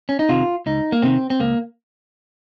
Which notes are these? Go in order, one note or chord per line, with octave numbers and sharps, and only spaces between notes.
C#4
D#4
C3 D#3 F4
C#2 D#4
A#3
C3 D#3 C4
C4
C#2 A#3